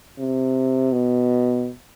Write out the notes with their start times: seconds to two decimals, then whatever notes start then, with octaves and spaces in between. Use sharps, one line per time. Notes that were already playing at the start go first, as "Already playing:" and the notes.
0.19 C3
0.92 B2